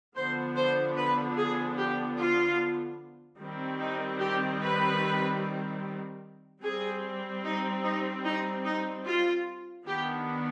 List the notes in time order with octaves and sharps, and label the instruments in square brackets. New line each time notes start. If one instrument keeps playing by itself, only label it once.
[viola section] D3 F3 B3 D4 C5
C5
B4
G#4
G4
F4
D#3 G3 C4
D#4
G4
B4
G3 C4 G#4
D#4
D#4
D#4
D#4
F4
D#3 B3 D4 G4